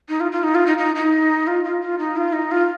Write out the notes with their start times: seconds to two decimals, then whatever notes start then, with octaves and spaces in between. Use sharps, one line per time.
0.09 D#4
0.20 F4
0.32 F4
0.43 D#4
0.55 F4
0.67 D#4
0.78 D#4
0.95 D#4
1.47 F4
1.64 F4
1.81 F4
1.99 D#4
2.17 F4
2.33 D#4
2.51 F4